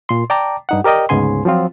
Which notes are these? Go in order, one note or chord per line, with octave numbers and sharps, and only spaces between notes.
A#2 C6
D5 G5 A5 A#5 D6
G2 D#4 F#5
G4 A#4 D5 D#5 G5
D2 G#2 C#3 B3 G#5 C6
F3 F#3 C4 F4